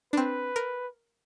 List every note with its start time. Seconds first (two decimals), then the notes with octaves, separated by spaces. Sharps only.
0.13 C4 D4 B4
0.56 A#4